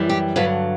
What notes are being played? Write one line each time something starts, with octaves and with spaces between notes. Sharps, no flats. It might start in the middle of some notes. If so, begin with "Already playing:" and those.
Already playing: F#2 E3 G3
G4
G2 D3 F#3 B4